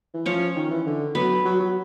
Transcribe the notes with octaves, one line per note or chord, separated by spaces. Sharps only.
E3
F3 C#4 C#5
D#3
E3
D3
F#3 B3 B4
F#3
F#3